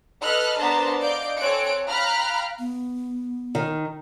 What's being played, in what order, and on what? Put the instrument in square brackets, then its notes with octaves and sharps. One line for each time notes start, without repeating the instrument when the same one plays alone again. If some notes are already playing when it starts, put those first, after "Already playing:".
[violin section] A4 B4 D#5 F6 F#6
B3 D4 A#4 C5 A5 A#5
D5 D#5 F5 G6 D7
C4 A4 C#5 G#5 F#6 D7
F5 G5 A#5 B5 F6 F#6
[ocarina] B3
[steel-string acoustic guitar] D#3